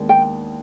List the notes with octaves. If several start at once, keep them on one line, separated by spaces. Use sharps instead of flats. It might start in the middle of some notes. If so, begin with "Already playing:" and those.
Already playing: D#2 D#3 G#3 B3 D4
G5